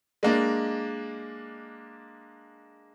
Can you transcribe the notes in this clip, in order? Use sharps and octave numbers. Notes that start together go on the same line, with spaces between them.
G#3 A#3 D4